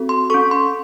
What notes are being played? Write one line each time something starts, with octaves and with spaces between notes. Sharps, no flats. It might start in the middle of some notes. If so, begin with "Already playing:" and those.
Already playing: C4 F#4 A4
C6
C#4 A4 C#6
C6